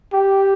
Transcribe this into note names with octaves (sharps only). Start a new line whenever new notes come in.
G4